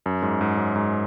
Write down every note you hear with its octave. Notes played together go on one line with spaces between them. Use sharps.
F#2
G#2
G#2
F#2
G#2